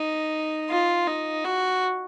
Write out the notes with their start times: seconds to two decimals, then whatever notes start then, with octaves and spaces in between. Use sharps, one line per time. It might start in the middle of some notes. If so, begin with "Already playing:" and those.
Already playing: D#4
0.69 F4
1.07 D#4
1.44 F#4